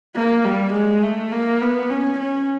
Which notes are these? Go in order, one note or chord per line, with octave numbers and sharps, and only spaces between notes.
A#3
G3
G#3
A3
A#3
B3
C#4
C#4